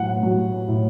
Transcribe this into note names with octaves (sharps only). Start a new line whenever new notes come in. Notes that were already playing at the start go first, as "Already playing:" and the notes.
Already playing: A2 F#3 F#5
F#3
A2